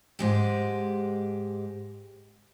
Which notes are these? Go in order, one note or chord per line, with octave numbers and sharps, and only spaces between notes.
G#2 G#3 G4